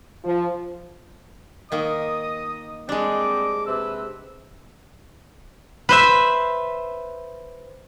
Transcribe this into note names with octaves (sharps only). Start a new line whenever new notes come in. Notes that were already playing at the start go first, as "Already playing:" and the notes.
F3
D#3 A#3 D#5 D#6
G3 G#3 C4 D4 D#5 D6
C3 B4 E6
B4 C5 E5